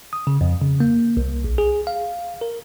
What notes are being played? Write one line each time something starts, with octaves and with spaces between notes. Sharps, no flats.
D#6
C#3
F2
C#3
A#3
C2
A#1
G#4
F5
A#4